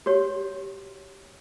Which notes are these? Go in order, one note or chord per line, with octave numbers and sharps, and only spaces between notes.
F#4 G4 C#5